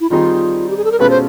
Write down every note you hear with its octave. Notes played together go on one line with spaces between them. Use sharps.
E4
D#3 G3 C4 D#4 F4 G#4
G4
G#4
A4
A#4
B2 G#3 C#4 F4 A4 B4
C5